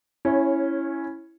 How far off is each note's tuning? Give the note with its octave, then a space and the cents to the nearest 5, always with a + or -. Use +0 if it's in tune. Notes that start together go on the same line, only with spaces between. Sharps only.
C#4 +0 E4 +0 C#5 -25